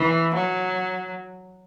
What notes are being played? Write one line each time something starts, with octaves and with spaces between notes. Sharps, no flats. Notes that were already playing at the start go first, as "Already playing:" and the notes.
Already playing: E3
F#3